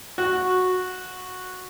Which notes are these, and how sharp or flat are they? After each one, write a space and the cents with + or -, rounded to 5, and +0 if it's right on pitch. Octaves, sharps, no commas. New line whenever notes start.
F#4 -10